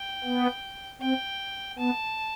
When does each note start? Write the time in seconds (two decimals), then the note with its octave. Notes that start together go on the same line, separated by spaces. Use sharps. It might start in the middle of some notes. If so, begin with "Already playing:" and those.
Already playing: G5
0.24 B3
1.01 C4 G5
1.79 B3 A5